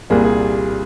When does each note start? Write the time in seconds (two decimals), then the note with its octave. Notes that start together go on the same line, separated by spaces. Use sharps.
0.10 C2 A#2 G3 A#3 G#4
0.25 G#4